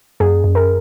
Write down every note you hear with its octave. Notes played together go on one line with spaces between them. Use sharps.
F#2 G#4
F#2
A#4